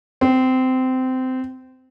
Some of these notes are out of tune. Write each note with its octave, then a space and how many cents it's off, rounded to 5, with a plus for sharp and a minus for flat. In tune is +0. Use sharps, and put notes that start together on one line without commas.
C4 -20